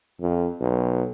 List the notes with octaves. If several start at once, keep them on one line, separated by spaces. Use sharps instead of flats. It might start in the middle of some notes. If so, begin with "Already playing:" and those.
F2
B1